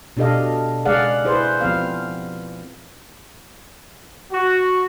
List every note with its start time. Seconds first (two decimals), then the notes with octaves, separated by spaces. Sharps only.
0.17 B2 D4 G4 A4 D#5 F5
0.85 C#3 G#3 G#4 D5 F5 F#5
1.25 E4 G#4 B4 C5
1.61 F3 B3 C4 F5
4.31 F#4